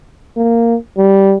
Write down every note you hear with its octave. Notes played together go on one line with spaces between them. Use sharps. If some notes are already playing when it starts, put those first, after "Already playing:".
A#3
G3